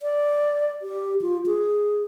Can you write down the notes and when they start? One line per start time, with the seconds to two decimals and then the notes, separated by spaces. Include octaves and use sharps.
0.02 D5
0.82 G4
1.22 F4
1.46 G#4